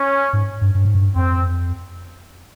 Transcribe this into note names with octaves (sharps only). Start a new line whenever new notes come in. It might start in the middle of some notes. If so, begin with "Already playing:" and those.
Already playing: C#4
G#2
G2
G2
G#2
G2
F2 C4